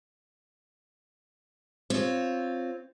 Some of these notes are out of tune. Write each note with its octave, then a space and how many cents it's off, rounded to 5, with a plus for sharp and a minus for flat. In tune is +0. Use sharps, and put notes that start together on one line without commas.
C4 +0 F4 +0 C#5 +0